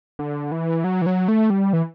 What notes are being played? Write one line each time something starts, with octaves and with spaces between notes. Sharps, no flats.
D3
E3
F#3
E3
F#3
A3
G3
E3